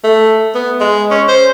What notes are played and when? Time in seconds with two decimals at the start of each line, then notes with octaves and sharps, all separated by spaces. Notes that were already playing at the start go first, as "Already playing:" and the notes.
0.04 A3
0.55 B3
0.81 G#3
1.11 C#4
1.28 C5